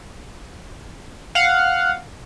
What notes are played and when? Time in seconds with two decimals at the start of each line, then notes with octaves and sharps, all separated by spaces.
1.35 F5 F#5